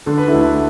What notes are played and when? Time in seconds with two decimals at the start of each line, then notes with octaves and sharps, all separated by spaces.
0.06 D3 A4
0.18 B4
0.27 E4 A4
0.33 D2